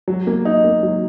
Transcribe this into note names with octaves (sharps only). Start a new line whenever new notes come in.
F#3
A#3
D#4
A#3
F#3